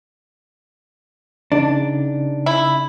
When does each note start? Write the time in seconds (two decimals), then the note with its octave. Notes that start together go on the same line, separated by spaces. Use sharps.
1.52 C#3 D4 D#4
2.46 E4